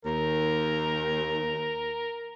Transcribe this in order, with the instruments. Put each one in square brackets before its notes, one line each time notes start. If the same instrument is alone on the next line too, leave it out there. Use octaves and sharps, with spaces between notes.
[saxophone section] D#2 [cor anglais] A#4